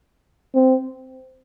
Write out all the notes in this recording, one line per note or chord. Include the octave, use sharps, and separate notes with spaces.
C4